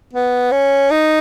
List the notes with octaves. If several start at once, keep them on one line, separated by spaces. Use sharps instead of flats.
B3
C#4
D#4